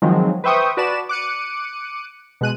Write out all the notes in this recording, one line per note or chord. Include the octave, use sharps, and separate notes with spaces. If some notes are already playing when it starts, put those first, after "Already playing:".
D#3 F3 F#3 G#3 C4
B4 C5 E5 G5 C#6 D#6
F#4 B4 D5 A5 E7
D6 F#6 C#7 D#7
B2 G#3 F#6 D#7